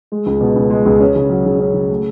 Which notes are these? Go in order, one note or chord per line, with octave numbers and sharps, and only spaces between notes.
G#3
C#2
B2
C#2
G#3
C#2
C#4
C#3
F#3
C#3
C#4
C#3
A3